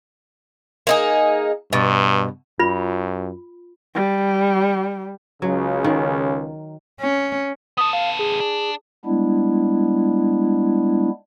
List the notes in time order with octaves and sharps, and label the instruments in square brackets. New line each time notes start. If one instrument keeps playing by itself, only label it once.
[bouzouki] A#3 D#4 G#4
[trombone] G2 [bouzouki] B2
[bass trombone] F#2 [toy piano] F4 B5
[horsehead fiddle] G3
[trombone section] C#2 C#3 [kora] F#3
[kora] D#3
[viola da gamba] C#4
[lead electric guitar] B3 A4 [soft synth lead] D#6
[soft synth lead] F5
G#4
[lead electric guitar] D4
[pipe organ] G3 G#3 B3 D4 E4